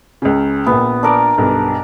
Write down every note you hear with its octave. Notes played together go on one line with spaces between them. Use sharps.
C#2 C#3
A#1 A#2 B3
D4 A#4 D5
B1 G2